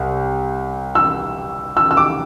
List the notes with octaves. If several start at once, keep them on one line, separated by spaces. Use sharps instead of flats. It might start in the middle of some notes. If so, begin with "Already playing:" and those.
Already playing: C2
E6
E6
E6
D6